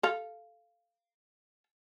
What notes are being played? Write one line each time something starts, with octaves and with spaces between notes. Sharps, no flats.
A4 F5